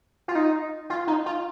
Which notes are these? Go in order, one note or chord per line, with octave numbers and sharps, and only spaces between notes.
F4
D#4
F4
D#4
F4